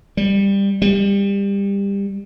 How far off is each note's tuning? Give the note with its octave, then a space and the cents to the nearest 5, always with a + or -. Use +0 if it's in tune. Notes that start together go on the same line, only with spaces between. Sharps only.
G3 +15
G3 +25